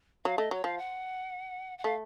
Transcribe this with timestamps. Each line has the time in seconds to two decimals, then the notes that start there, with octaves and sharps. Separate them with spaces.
0.25 F#3 F5
0.37 A3 D#5
0.51 F#3 C#5
0.64 F3 F5
0.78 F#5
1.78 F#5
1.84 A3 F5